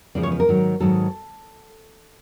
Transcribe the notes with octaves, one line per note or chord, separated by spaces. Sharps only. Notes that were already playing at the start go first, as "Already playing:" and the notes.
E2 C#3 F3 G#3 D5
C#5
B4
A#4
G#2 D#3 F#3
G#2 D#3 F#3 A4